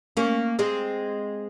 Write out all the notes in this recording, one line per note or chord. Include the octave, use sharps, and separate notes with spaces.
A#3 C#4
G#3 C4